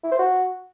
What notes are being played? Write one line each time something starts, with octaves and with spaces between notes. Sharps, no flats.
E4
C5
F#4